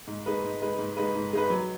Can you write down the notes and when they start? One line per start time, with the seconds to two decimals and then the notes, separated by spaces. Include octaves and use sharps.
0.07 G#2
0.26 G#3 D#4 B4
0.44 G#2
0.62 G#3 D#4 B4
0.79 G#2
0.97 G#3 D#4 B4
1.15 G#2
1.33 G#3 D#4 B4
1.50 F#3